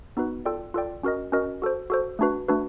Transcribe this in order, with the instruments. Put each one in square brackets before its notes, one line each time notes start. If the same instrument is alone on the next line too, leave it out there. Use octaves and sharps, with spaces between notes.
[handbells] B3 D#4 F#4 B4
F4 A4 D5 G5
F4 A4 D5 G5
C#4 F#4 A#4 D#5
C#4 F#4 A#4 D#5
F#4 A4 C5
F#4 A4 C5
A3 D4 F#4 B4
A3 D4 F#4 B4